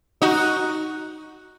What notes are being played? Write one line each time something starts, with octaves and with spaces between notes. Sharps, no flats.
D#4 F#4